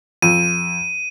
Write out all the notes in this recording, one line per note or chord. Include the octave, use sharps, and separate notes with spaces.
F2 D#7